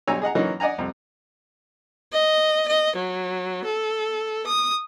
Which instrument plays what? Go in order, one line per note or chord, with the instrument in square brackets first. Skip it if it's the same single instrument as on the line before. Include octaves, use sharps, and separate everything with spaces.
[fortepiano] B1 G3 C#5 G#5 A#5 E6
G#4 D#5 F#5 A#5
E3 F#3 A#3 C#4 D#4
D5 D#5 F#5 G#5 A#5
C2 F2
[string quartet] D#5
D#5
F#3
A4
D#6